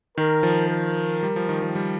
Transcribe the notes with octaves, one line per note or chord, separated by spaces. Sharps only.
D#3 A#4
F3
A#4
G3
F3
D#3
F3
G3